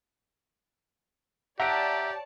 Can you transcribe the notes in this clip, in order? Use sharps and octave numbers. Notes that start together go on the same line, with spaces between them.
G4 C#5 D5 E5 F#5 A5 A#5 D7